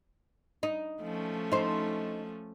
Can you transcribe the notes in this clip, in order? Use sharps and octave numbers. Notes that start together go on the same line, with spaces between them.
D#4
F3 A3 C#4
D#4 C5